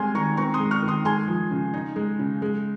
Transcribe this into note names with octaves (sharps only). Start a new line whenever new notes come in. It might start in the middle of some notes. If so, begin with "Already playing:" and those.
Already playing: G3 G#3 C4 G#5 C6 F6
D#3 A#5 C#6
C4 A#5 C#6
C6 D#6
G#3
C#6 F6
D#3
C6 D#6
G#3 G#5 C6
F3
C#3
D#4
G#3
C#3
G#3